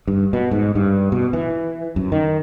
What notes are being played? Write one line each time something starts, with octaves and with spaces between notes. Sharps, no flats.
G2
B2
G#2
G2
B2
E3
F#2
D#3